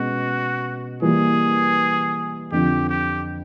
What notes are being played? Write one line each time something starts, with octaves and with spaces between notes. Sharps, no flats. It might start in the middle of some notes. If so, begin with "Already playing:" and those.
Already playing: B2 G#3 C#4 F#4
E3 G3 A#3 G#4
F2 D3 F3 G4
G4